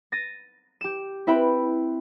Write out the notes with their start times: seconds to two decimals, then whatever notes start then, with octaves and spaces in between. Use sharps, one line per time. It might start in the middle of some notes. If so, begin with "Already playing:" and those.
0.12 A6 A#6 D#7
0.81 G4 E7
1.27 C4 E4 B4 E5 G5 B5